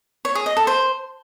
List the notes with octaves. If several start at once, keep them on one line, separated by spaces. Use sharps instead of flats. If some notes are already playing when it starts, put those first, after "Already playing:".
C#5
G#4
D#5
A4
C5